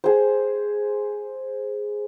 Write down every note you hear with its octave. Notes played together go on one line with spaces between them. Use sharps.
G#4 C5